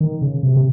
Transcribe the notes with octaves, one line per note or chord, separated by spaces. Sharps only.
D#3
C#3
C3
C3